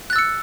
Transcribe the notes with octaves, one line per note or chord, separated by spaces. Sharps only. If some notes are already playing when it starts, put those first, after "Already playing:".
E6 F#6 A6 C#7